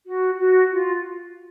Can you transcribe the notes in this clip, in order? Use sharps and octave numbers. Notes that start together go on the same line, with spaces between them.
F#4
F#4
F4